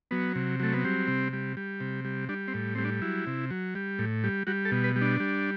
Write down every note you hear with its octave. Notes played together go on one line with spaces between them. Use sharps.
F#3 B3
C3
F#3 A3
B3
G3 C4
C3
G3
G3
C3
G3
G3 D4
C4
A2
G3 C4
D4
F#3 E4
C3
F#3
G3
A2
G3
G3 F#4
A4
B2
B4
G3
D4
G3